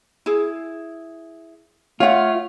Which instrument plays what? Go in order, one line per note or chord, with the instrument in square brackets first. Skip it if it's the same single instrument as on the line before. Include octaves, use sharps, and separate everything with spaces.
[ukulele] E4 G#4
[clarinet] A3 [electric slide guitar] F4 [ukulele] C#5 F#5